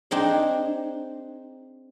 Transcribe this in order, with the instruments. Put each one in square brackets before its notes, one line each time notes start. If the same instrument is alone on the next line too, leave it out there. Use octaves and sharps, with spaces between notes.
[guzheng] C4 D4 D#4 G#4